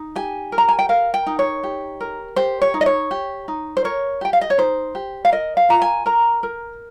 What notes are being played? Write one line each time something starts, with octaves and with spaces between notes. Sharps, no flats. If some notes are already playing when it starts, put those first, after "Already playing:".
Already playing: D#4
G4 G#5
A#4
A#5
G#5
G5
A#4 F5
G5
D#4
C#5
G4
A#4
G4 C5
C#5
D#4
D#5
C#5
G4
D#4
C5
A#4 C#5
G4 G5
F5
D#5
C#5
D#4 C5
G4
F5
A#4 D#5
F5
F4 A#5
G#5
A#4 A#5
A#4